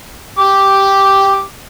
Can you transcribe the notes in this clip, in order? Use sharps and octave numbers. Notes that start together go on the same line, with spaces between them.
G4 D6